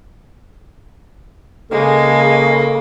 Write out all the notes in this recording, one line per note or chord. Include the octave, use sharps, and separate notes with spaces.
C#3 G#3 A#3 A4